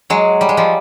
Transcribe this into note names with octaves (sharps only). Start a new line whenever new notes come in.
F#3 G#3
G3
G#3
F3 G3